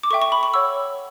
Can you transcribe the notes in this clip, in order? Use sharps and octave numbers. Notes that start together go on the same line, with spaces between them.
D6
A4 E5 G5 C#6
C#6
B5
C#6
C#5 F#5 E6